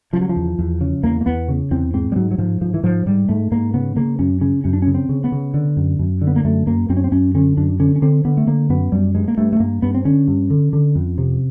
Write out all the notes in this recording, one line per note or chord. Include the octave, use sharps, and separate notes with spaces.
C#3 F3
F#3
F3
E2
E2
C#3
E2 A#3
A#3
E2 B3
C#3
E2 C4
G#2 C4
G3
G#2 F#3
F#3
G#2 F3
G#2 F3
E3
G#2 F3
G#2 G3
G#2 A3
G#2 A#3
C#3 B3
C#3 A#3
F#2 C#4
C#3 C#4
F#2 C#4
D4
C#3 C#4
C4
C#3
B3
C#3
D3
F#2
F#2
D3
B3
A#3
F#2 A3
F#2 A#3
F#2 C4
C#4
C4
F#2 C#4
D3 C#4
F#2 D4
D3 C#4
C#4
D3 C4
D3 B3
A3
D3 A#3
F#2 B3
F#2 G3
G2 G#3
A#3
G2 A3
A3
G2 A#3
G2 B3
C4
D3 C#4
G2
D3
D3
F2
C3